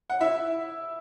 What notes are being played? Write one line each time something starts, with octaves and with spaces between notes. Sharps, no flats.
F#5
E4 E5